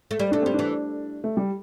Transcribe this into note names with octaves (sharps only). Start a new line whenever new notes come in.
A3
G3
A3 D4
G3 C4
E3 D4
A3
G3